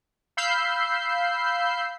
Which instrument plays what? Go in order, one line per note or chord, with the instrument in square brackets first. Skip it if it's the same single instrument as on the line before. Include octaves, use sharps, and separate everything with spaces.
[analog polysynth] F5 B5 E6 G6 C7